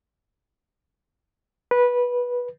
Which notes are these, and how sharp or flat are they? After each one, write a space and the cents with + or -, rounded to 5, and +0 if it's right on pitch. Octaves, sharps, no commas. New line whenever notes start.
B4 -15